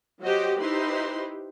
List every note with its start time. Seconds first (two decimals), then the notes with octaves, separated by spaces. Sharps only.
0.21 F#3 F#4 G4 C5 D#5
0.60 D#4 E4 G4 B4 C5 C6